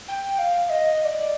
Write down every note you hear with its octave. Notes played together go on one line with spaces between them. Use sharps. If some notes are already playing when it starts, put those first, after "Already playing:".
G5
F5
D#5
D#5
D5